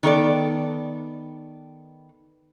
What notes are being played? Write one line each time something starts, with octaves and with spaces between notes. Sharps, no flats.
D#3 B3 A4 D5